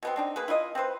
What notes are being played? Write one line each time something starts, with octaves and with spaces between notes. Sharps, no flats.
B2 B3 C4
C4 D4 D#4
A#3 G#4 B4
E4 F4 A#4 D#5
C4 E4 B4 C5